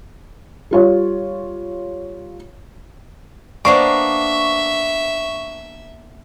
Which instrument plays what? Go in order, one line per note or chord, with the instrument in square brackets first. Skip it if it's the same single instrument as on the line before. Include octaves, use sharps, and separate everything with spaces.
[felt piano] G3 F4 C#5
[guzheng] A#3 B3 D4 [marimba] C5 D5 [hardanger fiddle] E5 [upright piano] C#6